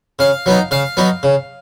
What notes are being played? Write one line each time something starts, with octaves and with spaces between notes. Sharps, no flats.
C#3 F5
F#3 B3 D#4
C#3 F5
F#3 B3 D#4
C#3